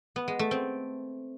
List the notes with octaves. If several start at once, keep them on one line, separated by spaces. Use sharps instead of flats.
B3
G#3
A3
C4